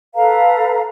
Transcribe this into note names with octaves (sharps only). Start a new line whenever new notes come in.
A4 B4 F5 A#5